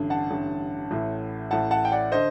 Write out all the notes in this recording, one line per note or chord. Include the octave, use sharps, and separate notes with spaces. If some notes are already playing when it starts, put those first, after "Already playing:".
Already playing: A1 G2 D3
F#5 A5
A1 G2 D3
A1 A2
A1 A2 F#5 A5
F#5 A5
G5
D5 F#5
D3 C5 D#5